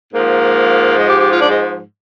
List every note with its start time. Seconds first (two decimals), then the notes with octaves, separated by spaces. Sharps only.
0.13 G#2 F3 A#3
0.97 G#3
1.08 G4
1.19 G4
1.30 F4
1.40 D4
1.50 G#3